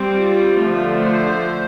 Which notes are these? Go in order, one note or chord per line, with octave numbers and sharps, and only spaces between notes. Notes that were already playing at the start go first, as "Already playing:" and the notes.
Already playing: G3 C4
F4
D3 F3 A3
C5